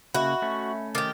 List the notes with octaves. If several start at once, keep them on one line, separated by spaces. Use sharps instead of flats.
C#3 A#3 F#4 D#5 E5 B5
A3 C#4
D#3 G4 D6 A6